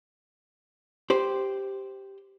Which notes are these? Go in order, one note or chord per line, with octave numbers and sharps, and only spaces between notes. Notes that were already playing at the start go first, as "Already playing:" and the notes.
G4 C5